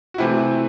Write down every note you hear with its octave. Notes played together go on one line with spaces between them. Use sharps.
F#4
C3 E3 A3 C4 E4